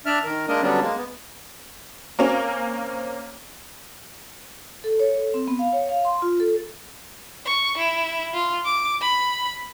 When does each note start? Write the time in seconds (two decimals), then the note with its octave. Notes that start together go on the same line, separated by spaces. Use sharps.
0.06 D4 D5 E5 F6
0.24 D#3 A#4
0.48 G#3 A#3 D4 A#4 D#5
0.62 D3 F#3 G3 B3 C#4 D4
0.80 G#3 A#3
0.97 B3
2.19 A#3 C4 C#4
4.84 A4
5.00 C#5
5.17 A4
5.34 C4
5.48 B3
5.59 F5
5.73 C#5
5.89 F5
6.05 C6
6.22 F4
6.40 A4
7.46 C#6
7.77 E4
8.34 F4
8.65 D6
9.01 B5